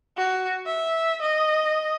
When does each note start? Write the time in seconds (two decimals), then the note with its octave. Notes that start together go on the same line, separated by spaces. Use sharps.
0.17 F#4
0.66 E5
1.22 D#5